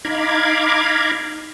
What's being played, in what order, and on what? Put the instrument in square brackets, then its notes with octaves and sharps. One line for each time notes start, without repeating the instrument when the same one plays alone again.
[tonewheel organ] D#4 F5 A#5 B5 D6 G#6